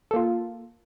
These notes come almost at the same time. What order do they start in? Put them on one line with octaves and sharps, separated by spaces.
A4 A#3 F4